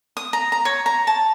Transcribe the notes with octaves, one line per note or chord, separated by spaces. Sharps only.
D#6
A#5
A#5
C#5
A#5
A5